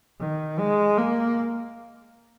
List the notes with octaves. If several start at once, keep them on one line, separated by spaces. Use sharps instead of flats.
D#3
G#3
A#3